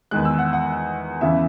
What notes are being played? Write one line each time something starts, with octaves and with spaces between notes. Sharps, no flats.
E2 D#3 G#3 F#6
E6
F#5
F#5
E2 C#3 E3 E5